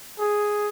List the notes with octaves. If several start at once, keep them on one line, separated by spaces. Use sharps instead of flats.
G#4